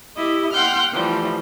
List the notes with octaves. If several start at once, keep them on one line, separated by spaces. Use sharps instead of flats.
E4 G4 D#5
F#5 G5 C6 F6 G6
E3 F3 G3 A3